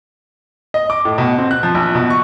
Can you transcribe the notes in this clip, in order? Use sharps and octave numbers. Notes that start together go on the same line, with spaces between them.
D#5
D6
A2
B2
C4
F#6
F3
A#1
B2
C#6